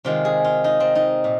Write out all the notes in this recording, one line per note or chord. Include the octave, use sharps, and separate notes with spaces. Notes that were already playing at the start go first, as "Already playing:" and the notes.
C3 D#3 G#3 F4
G#4
F4
D#4
C4
D#4
A#2